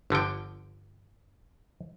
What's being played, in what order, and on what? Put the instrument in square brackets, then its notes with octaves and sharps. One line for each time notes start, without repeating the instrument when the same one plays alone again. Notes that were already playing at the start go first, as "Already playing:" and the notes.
[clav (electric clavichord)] G1 D3 F3 G5